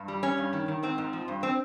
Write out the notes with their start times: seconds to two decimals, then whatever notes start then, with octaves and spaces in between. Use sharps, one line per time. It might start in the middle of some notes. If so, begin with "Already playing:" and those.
Already playing: G2
0.08 G3
0.23 G3 C#4
0.38 G2
0.53 D#3
0.68 D#3
0.83 G#2 C4
0.98 G#2
1.13 F3
1.28 G2
1.43 C4